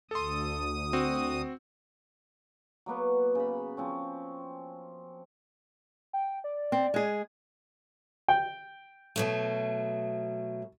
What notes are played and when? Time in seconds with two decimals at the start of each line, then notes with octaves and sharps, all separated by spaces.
0.11 D2 A4 C6 D#6
0.93 C4 F#4
2.86 F#3 A#3 B3 B4
3.35 C#3 B5
3.77 F3 C4 C#4
6.13 G5
6.44 D5
6.72 C4
6.94 G#3 G#4
8.28 G5
9.16 B2 F#3 A3